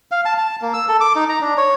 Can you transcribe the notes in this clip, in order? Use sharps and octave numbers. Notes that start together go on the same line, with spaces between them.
F5
A5
A5
A#3
E6
A4
D6
D#4
A#5
D4
C#5